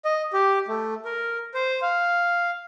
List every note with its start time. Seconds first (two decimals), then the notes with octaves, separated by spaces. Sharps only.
0.05 D#5
0.33 G4
0.68 A3
1.05 A#4
1.54 C5
1.82 F5